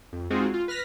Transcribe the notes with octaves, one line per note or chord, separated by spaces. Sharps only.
F2
G#3 C4 D#4 F4 F#4 G#4
F4
B4 F6 A#6 B6